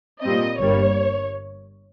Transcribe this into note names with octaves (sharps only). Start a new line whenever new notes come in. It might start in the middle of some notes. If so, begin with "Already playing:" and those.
A#2 G3 C4 D#5
G1 G2 G3 A#3 C#5